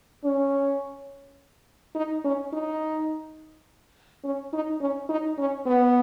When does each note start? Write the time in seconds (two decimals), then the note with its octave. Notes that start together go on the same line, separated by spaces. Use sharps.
0.24 C#4
1.95 D#4
2.25 C#4
2.53 D#4
4.24 C#4
4.53 D#4
4.81 C#4
5.09 D#4
5.38 C#4
5.66 B3